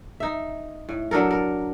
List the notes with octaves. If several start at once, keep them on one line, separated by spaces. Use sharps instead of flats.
D#4 E5
A2
F#3 D4 A4 A#4
A#4